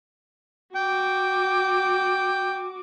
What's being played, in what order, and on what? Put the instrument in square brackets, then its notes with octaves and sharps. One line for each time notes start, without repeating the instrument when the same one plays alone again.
[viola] F#4 D6 [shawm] G5